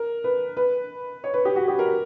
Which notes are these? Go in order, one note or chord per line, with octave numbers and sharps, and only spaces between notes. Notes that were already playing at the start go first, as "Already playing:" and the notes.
Already playing: A#4
B4
B4
C#5
B4
G4
F#4
G4
A#4